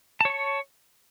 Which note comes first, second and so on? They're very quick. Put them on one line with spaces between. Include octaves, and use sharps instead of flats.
A5 C#5 C#6